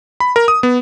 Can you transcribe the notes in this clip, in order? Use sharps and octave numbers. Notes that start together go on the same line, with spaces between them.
B5
A#4
D#6
B3